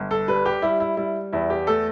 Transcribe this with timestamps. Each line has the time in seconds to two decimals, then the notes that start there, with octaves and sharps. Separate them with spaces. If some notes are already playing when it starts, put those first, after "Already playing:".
Already playing: G1
0.11 A4
0.28 G3 B4
0.46 G4
0.62 G3 E4
0.80 E4
0.97 G3 E4
1.33 E2 E4
1.50 G4
1.67 A3 A4